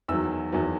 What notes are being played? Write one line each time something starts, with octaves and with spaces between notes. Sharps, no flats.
E2 D#3 F#3 E6
E2 D#3 F#3